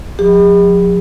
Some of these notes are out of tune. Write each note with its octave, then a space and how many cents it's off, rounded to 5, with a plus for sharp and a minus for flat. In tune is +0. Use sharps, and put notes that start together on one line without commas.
F3 +45 G#4 -45